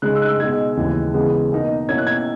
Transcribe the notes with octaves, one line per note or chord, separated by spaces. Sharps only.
C#3 G#3 D#4 F#6
E6
F#6
E6
B2 G#3 D#4 G#6
D#2 C#3 E3 G#3
C#3 E3 G#3 B3
B2 A#3 D#4
B2 A#3 C#4 E4 G#6
F#6
G#6